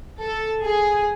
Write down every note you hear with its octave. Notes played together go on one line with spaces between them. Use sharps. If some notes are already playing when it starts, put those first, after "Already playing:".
A4
G#4